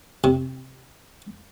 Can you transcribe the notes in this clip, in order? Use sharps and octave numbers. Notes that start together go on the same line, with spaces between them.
C3